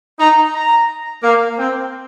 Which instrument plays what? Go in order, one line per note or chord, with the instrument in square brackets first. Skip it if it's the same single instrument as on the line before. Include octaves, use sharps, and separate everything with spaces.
[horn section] D#4 [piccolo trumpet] A#5
[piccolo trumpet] A#5
[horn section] A#3 [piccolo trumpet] F5
[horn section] C4 [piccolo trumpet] G5